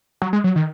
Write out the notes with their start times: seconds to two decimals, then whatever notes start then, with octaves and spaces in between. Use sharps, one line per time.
0.22 F#3
0.33 G#3
0.44 F#3
0.56 D#3